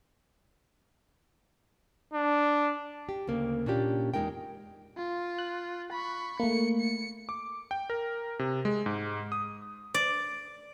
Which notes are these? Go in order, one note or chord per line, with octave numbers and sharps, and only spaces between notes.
D4
G4
D2 C#3 A#3
A#2 C#4 D4 F4 G4
E2 A#2 G#3 D#4 A#4 G5
F4
F#6
B5 C#6
A3 A#3 C#7
C#7
D6
G5
A#4
C3
G#3
G#2
D#6
D5